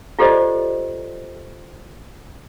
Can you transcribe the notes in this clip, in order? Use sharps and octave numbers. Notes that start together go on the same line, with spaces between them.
F4 G4 A4 C5 D5 D#5